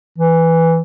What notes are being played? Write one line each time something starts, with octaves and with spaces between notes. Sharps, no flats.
E3